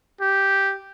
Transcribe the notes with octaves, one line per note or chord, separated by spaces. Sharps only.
G4